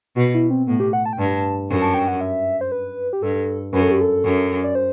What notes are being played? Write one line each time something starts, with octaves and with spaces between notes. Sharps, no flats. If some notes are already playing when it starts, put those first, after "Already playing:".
B2 F#4
E4
C4
A2 B3
G4
F#5
A5
G5
G2 A5
F#2
A5
G5
F#5
E5
C5
B4
G4
G2 A4
F#2 B4
A4
G4
A4
F#2
D5
C5